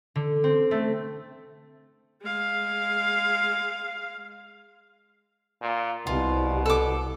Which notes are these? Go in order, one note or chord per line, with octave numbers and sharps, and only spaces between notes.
D3
C4
A3
G#3 F5
A#2
C2 B2 F4
A4 D6